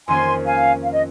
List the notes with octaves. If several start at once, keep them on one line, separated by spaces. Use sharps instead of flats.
F2 D#3 A#3 C#4 F4 G#5 C6
F5 G#5
F5
D#5